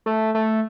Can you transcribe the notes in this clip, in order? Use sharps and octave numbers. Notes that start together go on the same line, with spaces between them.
A3
A3